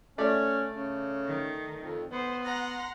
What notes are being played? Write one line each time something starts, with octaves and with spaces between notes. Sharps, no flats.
A3 C#4 D5
C#3
D#3
F2
B3 C5
F#5 A#5 C6